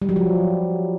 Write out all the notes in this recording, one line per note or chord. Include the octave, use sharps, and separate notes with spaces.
G3
F#3
F3